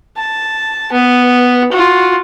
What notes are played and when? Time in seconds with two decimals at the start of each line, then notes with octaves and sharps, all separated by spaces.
0.17 A5
0.92 B3
1.72 F4 F#4